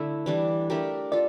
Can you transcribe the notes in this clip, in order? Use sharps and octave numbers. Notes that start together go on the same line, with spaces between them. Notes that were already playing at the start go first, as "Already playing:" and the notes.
Already playing: D3 A3 E4
E3 G3 D4
A3 D4 G4 A#4
F4 A4 D5